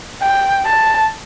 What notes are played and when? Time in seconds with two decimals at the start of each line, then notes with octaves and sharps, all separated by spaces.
0.22 G5
0.66 A5